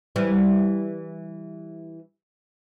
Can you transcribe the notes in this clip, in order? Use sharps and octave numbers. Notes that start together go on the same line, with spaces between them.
E3 G3